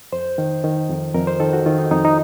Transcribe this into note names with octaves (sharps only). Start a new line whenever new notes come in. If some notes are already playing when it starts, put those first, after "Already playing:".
F2 C5
D#3
D#3
F2
F2 A#4
C5
D#3 A4
F#4
D#3 F4
D#4
F2 D#4
D#4